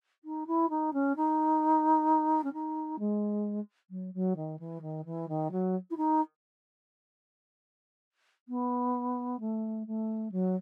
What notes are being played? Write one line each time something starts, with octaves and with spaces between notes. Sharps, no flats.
D#4
E4
D#4
C#4
D#4
C#4
D#4
G#3
F#3
F#3
D#3
E3
D#3
E3
D#3
F#3
E4
D#4
B3
A3
A3
F#3